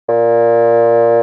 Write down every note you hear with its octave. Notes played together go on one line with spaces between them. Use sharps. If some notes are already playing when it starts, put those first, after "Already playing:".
A#2